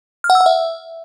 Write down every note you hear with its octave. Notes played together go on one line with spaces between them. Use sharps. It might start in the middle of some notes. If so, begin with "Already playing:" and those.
F6
F#5
E6
F#5
E5